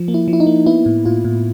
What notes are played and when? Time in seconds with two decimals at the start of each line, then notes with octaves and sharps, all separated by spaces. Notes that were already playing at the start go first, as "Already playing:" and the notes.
Already playing: F3
0.08 A#3
0.14 E4
0.28 F3
0.33 E4
0.40 D#4
0.47 A#3
0.66 B3 E4
0.86 A2
1.05 A2 F4
1.25 A2